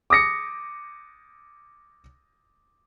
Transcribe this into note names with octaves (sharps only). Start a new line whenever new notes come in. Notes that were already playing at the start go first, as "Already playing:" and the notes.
D6 D#6 A#6 C#7